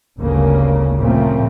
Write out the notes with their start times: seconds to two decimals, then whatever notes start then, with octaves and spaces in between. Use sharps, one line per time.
0.18 G1 D2 C#3 A#3
0.98 A#2 C#3 F3 A3 A#3 C4